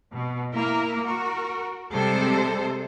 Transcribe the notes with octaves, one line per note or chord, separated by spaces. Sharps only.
B2
A#3 E4 A#4
F#4 A#4
C3 G3 G#3 C4 A4 C5